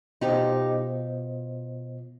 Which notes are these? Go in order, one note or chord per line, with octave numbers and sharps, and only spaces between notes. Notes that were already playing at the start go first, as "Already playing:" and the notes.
B2 B3 D#4 F4 G4 C5 D#5